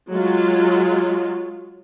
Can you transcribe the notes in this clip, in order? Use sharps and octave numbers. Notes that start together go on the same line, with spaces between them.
F#3 G#3 F4